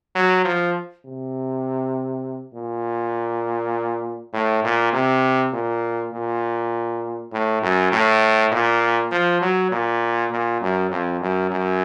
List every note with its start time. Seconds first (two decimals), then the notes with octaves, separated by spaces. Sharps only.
0.15 F#3
0.45 F3
1.05 C3
2.54 A#2
4.33 A2
4.64 A#2
4.93 C3
5.53 A#2
6.13 A#2
7.32 A2
7.62 F#2
7.92 A2
8.52 A#2
9.12 F3
9.41 F#3
9.72 A#2
10.31 A#2
10.61 F#2
10.91 F2
11.21 F#2
11.51 F#2